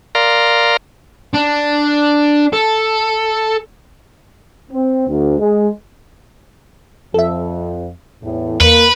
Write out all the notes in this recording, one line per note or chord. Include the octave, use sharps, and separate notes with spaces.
A#4 D5 F5 A#5 C6
D4
A4
C4
D2
G#3
F2 A4 E5
E2 A2
E2 A#3 B4 C#7